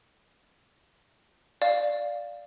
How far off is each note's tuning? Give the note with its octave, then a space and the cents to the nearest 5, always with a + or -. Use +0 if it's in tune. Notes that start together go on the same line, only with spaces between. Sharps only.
D5 +0 F5 +0